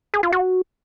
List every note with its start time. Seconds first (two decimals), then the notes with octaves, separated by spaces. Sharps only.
0.14 G#4
0.23 F4
0.32 F#4